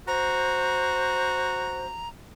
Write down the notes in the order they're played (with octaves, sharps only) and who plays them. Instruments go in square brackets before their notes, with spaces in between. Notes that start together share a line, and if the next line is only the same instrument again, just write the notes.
[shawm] F#4 [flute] C5 [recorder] A#5